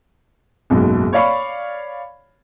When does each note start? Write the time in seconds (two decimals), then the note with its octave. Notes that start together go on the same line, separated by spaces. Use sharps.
0.70 F#1 B1 G#2 F#3
1.13 C#5 D5 F5 B5 C#6